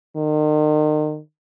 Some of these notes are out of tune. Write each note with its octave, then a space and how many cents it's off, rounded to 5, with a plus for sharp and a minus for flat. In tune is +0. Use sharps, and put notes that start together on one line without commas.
D#3 -35